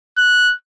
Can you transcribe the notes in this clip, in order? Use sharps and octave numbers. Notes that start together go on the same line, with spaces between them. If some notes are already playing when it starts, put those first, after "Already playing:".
F#6